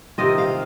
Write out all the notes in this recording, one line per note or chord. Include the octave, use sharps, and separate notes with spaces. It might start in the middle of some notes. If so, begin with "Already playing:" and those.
C3 D#3 C4 F4 D#5
F5